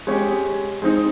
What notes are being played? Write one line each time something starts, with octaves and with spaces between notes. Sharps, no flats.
G#3 C#4 G4
G#3 C4 D#4